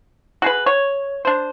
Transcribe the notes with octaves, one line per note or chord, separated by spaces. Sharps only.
F#4 G#4 B4
C#5
D4 C5